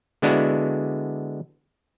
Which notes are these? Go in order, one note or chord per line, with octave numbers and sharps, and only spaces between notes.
D3 G#3 B3 D4 E4 F#4